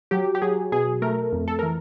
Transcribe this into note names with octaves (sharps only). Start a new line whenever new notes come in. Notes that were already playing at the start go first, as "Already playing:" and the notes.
F#3 G4
G4
F#3 G#4
B2 G#4
A3 A#4
F2
A4
E3 A#4